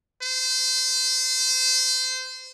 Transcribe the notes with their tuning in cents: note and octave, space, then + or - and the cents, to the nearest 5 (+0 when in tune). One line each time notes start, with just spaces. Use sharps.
C5 -25